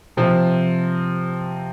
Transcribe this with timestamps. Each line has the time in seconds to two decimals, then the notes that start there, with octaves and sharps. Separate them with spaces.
0.17 C3 F3 C4